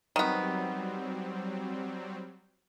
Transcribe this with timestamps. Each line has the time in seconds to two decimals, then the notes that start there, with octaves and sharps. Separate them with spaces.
0.16 D#3 F#3 G3 B3 C4